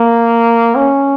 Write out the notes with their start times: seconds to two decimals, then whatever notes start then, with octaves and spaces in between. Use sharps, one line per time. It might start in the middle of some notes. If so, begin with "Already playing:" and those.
Already playing: A#3
0.75 C#4